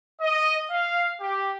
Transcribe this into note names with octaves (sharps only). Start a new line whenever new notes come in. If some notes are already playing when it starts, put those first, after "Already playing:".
D#5
F5
G4